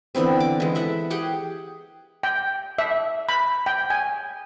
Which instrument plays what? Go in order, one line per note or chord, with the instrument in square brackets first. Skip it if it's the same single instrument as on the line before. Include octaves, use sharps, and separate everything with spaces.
[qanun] D3 E3 B3 C4
D6
E3 G#3
A4 E5 F#5
G4 G#4 F#5 G5
[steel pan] G5
E5
B5
G5
G#5